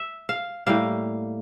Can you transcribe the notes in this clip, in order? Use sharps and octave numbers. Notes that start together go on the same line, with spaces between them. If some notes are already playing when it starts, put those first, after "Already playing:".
Already playing: E5
F5
A2 G3 A#3 F5